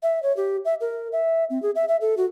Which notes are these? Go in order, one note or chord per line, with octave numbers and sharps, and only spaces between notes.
E5
C#5
G4
E5
A#4
E5
C4
G#4
E5
E5
A4
F#4